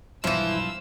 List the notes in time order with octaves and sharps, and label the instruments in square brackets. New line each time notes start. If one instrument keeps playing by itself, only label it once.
[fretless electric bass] B1 G2 [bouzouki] E3 E4 [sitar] F3 [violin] E6